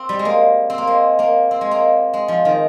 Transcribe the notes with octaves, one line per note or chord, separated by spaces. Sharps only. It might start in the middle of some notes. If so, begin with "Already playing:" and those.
Already playing: C4
G3
G#3
A#3
C4
A#3
G#3
A#3
C4
G#3
A#3
G#3
F3
D#3